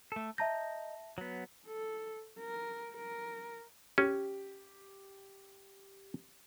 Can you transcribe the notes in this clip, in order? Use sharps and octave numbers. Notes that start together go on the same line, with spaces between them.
A3 A4
D#5 E5 A5 A#5 G6 A#6
F#3 B3
A4
A#4
A#4
C#4 G4